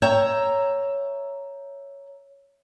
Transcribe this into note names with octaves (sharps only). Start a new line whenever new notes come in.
C#5 E5 G5 A#5